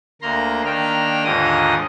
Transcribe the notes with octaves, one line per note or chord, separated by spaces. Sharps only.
D2 A#3 A#5 C6
D#3 A#3 D4 G5 F6
D#2 G#2 D3 F4 D#5 D#6